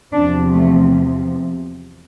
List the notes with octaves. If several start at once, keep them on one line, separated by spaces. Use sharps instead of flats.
E2 C3 F3 D4
A3